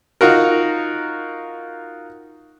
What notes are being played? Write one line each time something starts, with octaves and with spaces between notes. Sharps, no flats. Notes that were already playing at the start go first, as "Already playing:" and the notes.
D#4 F4 F#4 A#4